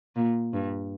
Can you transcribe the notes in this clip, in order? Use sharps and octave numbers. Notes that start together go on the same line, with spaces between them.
A#2
G2